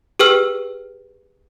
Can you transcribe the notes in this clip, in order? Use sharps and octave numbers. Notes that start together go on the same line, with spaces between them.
G4 G#4 B4 G5 E6 F6